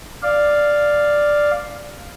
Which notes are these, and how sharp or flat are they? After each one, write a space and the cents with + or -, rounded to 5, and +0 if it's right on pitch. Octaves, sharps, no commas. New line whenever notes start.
D5 +0 F5 +0